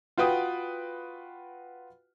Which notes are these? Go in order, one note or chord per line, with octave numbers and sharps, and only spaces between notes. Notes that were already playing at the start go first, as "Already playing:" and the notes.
F4 F#4 B4 G5 D#6